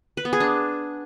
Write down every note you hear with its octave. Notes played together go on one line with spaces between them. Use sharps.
B4
B3
G#4
D4